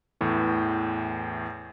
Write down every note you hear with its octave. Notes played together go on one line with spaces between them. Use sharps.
E2 A2 E3